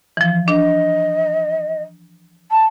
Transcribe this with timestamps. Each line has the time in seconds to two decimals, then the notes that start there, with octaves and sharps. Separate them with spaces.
0.17 E3 F3
0.48 D4 D#5
2.51 A5